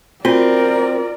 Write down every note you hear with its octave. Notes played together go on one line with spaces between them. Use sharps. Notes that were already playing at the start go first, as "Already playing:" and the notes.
C4 F4 F#4 A#4 D5